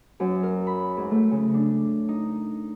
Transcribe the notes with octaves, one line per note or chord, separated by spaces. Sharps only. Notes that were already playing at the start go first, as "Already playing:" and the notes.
F#2
A#4
B5
G#2
A3
C#3
D4
D#4